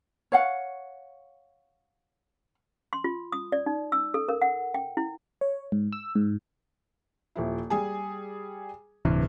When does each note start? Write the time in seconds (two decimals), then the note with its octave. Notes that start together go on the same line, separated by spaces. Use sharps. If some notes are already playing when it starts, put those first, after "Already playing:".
0.32 C#5 F5 F#5
2.93 C6
3.04 F4
3.32 D#6
3.52 D5
3.66 D#4
3.92 E6
4.14 A4
4.29 A#4
4.42 F#5
4.74 G5
4.97 E4
5.41 C#5
5.72 G#2
5.93 E6
6.15 G#2
7.36 D#1 F3 E4
7.70 G3 G#4 G#5
9.05 D1 G2 C3 E3